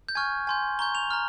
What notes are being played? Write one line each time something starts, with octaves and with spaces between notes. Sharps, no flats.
G6
G#5 C#6 F6 G#6
G#5 C6 G6
A#5 C#6 G6 G7
F7
A#5 F6